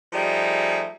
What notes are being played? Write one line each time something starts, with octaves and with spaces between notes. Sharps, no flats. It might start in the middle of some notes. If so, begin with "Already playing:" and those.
F3 G3 A3 D#4 G#4